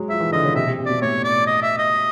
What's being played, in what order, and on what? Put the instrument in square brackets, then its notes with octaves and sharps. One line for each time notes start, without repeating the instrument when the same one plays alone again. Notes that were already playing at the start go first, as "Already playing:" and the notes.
Already playing: [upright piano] F#3 G#3
[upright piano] F3 [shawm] E5
[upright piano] E3
[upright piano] D3 [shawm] D#5
[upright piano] C#3
[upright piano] C3 [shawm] E5
[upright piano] C3
C3
[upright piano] B2 [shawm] D5
[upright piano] A2 [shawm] C#5
[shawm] D5
D#5
E5
D#5